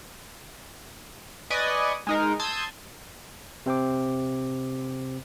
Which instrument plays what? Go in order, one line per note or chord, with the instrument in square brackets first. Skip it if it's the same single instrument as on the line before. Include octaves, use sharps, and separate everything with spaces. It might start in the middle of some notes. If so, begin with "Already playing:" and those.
[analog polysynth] B4 D5 D#5 G#5 C#6 D#6
G#3 D#4 A#4
A5 C6 D#6 E6 G6 G#6
[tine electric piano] C3 C4 C5 D6